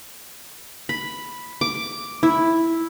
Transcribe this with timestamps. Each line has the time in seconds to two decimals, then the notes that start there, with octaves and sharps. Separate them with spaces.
0.89 B5
1.61 D6
2.23 E4